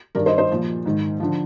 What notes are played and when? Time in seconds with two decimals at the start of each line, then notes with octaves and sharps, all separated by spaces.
0.15 G2 A#4 D5
0.19 D#3
0.26 C5 D#5
0.38 C5 D#5
0.51 A#2 F3
0.86 G#2 D#3
1.20 D3 F3